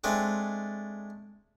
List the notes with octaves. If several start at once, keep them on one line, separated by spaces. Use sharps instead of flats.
G#3 A3 C4 D4